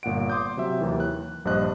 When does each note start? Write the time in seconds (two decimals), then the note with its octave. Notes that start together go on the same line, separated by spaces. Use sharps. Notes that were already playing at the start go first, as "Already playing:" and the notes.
0.03 G1 A#2 F#5 D7
0.30 C6 D6 D#6 G6
0.57 C3 F#3 E5
0.80 D#2 D#3 E3 F#3
1.00 F#6
1.45 A#1 G2 D4 C5 D#5 F#6